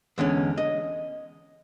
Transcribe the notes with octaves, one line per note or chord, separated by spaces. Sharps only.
E2 D3 G#3 C#4
D#5